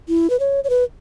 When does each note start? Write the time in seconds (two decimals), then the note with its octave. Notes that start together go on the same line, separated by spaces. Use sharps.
0.08 E4
0.30 B4
0.40 C#5
0.64 C#5
0.70 B4